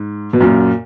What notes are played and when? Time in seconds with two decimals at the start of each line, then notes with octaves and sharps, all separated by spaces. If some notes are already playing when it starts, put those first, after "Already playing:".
Already playing: G#2
0.33 B2
0.40 F#2 A#2